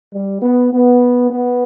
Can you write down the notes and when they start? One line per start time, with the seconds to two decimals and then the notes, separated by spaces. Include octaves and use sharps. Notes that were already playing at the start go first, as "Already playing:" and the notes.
0.13 G3
0.42 B3
0.72 B3
1.30 B3